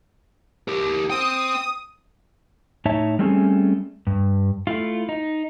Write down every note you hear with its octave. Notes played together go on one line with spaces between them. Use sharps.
G4 A#4
C5 G5 D#6
A2 D#4 C#5 E5 A5
G3 A3 C4 C#4 G#4
G2
A3 E4 F4
D#4